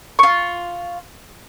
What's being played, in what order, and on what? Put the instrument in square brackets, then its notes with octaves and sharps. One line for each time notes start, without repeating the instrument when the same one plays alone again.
[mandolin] F4 C#6